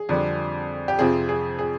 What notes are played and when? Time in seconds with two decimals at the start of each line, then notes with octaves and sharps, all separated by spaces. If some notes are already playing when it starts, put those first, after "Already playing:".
Already playing: G#4
0.09 F2 D3 G3
0.88 G4
0.99 F2 C3 F3 C4 G#4
1.29 G#4
1.59 G#4